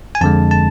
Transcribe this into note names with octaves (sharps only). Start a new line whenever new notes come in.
G#5
F2 D3 G#3 A5
A5